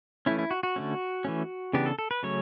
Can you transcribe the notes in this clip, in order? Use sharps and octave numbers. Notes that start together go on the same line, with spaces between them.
E3 A3 C#4 E4
E4
F#4
F#4
D3 A3 C#4
E3 A3 C#4
C#3 E3 B3 D4 G4
A4
A4
B4
C#3 F#3 A3 C#4 C#5